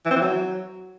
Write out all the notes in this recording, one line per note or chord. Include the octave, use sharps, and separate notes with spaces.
E3
C4
E3
F#3